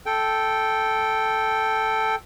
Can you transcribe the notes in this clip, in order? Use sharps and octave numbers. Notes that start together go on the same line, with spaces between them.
A4 G5